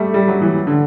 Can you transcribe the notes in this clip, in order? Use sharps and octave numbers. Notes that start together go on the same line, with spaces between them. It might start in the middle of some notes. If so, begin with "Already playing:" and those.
Already playing: G3 A3
G3
F#3
E3
D3